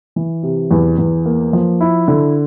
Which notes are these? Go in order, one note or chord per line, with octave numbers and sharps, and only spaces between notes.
E3
C3
E2
E2
A#3
F3
E4
D3